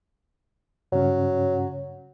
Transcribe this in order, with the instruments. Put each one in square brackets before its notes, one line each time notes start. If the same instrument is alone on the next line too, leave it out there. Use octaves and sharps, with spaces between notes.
[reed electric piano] G2 C#3 C#4 [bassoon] F#3